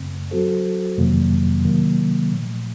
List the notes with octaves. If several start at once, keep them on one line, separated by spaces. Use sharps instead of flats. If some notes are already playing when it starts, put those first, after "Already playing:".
Already playing: F#2 C#3 A3 C4
F#3 C4 F#4 A4 C5
F2 C3 D#3 F#3 A#3
C3 D#3 F#3 A#3
A#2 F3 A3